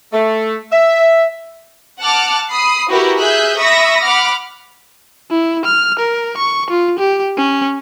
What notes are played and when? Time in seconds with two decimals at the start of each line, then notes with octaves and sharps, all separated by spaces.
0.13 A3
0.72 E5
2.01 F#5 A5 D6 F6 F#6
2.50 B5 D#6 C7
2.89 E4 F#4 G4 A#4 B4
3.19 G#4 E5 G#5 E6 F#6 G6
3.59 E5 B5 C#6 D#6 E6 A#6
4.02 F#5 B5 D6 F6
5.30 E4
5.65 F6
5.99 A#4
6.37 C#6
6.70 F4
6.99 G4
7.37 C#4